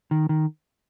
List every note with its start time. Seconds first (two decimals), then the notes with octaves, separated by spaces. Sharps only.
0.11 D#3
0.29 D#3